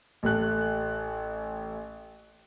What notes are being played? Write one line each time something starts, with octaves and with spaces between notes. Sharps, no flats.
A1 A3 F#6